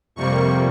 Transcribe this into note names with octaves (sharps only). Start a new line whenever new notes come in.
F2 C3 G3 A#3 C#6